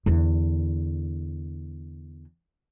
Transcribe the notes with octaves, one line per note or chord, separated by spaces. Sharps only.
E2 D3